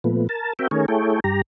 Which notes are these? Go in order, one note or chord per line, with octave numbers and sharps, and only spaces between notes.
A#2 F3 A3 B3
A#4 A5
C4 F#4 A#4 E5 G5
D#3 A3 C#4 G#4 A#4 C#5
A3 E4 G#4 A4 C#5 G5
G2 G4 A#5